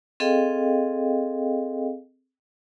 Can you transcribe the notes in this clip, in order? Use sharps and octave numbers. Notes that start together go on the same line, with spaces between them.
C4 G#4 A4 D#5 F5 G5